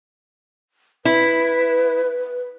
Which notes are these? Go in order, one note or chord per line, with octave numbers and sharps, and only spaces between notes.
E4 B4